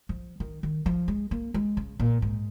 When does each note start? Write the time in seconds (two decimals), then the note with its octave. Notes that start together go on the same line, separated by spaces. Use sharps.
0.09 F3
0.40 D#3
0.63 D#3
0.86 F3
1.08 G#3
1.31 A#3
1.54 G#3
1.77 C#3
2.00 A#2
2.22 G#2